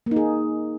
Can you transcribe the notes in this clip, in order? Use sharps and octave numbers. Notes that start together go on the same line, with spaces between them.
A#3 D#4 G#4